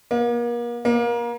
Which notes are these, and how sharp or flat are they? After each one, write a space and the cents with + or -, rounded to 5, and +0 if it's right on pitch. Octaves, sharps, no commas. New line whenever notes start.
A#3 +40
A#3 +30